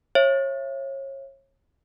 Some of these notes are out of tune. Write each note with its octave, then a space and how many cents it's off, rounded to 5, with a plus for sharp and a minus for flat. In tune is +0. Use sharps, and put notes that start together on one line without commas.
C#5 -30 E5 +25